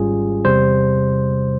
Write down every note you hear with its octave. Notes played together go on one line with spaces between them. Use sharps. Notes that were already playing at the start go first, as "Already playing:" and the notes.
Already playing: G#1 G#2 G3 C#4 F4 G#4
E2 C3 G3 C5